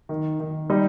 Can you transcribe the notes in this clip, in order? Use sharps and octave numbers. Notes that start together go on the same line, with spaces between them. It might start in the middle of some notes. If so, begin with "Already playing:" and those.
D#3
D#3
G3 D#4 D#5